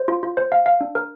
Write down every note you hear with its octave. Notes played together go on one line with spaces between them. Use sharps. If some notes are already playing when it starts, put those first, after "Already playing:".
Already playing: C5
F4
F4
C5
F5
F5
D4
A#4